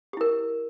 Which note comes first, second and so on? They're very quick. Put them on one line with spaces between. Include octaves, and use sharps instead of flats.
G4 E4 A#4